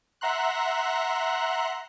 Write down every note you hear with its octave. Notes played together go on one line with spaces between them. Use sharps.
E5 F#5 A#5 C6 F#6